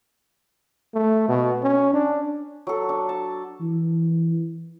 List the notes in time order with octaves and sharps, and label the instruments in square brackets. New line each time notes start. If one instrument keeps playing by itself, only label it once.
[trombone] A3
B2
C#4
D4
[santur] F#3 A4
D4
A5
[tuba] E3